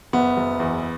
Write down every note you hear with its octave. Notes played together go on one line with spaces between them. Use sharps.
F#1 B3
F#1
E2